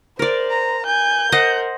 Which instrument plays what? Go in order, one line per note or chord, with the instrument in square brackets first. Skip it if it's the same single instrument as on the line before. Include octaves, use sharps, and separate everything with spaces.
[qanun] A#4 D5 [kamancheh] C5
[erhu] A#5
[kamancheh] G#5 [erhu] G6
[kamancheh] A#4 [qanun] C5 D#5 F#5